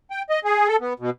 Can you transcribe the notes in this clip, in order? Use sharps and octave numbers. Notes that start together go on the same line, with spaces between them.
G5
D#5
G#4
A4
B3
B2